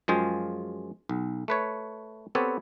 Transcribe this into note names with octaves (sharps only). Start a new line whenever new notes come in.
F#2 F3 G#3 F4 G#4 G5
B1
A3 B4 C#5
B3 C4 G4 A4 B4 C#5